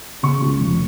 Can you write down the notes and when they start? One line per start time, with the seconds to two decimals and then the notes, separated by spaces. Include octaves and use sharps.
0.23 C#3 C#6
0.41 C#2
0.60 F1